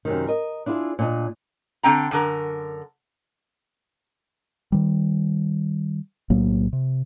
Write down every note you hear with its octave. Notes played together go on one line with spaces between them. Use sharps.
F#2 C3 D#3
A#4 D#5
D4 E4 F4 G4 G#4
A#2 D4 D#5
D3 C4 G5 A#5
F#2 D3 A#4
D#3 G3
B1 A2 F#3 A#3
C3